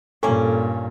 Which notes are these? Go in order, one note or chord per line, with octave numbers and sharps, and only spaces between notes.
G2 A#2 A#3 C#4 A4